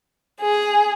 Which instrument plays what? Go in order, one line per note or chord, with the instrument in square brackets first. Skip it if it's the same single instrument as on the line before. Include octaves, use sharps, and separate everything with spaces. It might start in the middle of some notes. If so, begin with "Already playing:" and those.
[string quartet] G#4